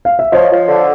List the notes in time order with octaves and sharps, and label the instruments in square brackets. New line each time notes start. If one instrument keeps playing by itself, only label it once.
[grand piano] F5
E5
[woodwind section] F3 [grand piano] C#5 D#5
[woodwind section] F3
D3